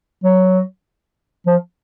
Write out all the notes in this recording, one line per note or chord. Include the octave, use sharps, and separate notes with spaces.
F#3
F3